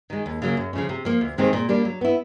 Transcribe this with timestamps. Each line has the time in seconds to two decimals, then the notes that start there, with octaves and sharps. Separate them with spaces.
0.10 D#3 G#3
0.26 D#2
0.42 C#3 F#3 A#3
0.57 F#2
0.73 C#3 F3 A3 C#4
0.89 C3
1.05 F3 A#3
1.21 D2
1.38 C3 D#3 G#3 C4
1.53 A#2
1.69 G3 A#3 D4
1.85 F#3
2.01 B3 E4